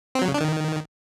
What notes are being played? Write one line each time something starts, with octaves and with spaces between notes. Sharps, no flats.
C4
F#3
C#3
D4
D#3